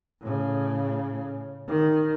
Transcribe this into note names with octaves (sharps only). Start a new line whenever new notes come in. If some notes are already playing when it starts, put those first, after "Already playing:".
A2 C#3
D#3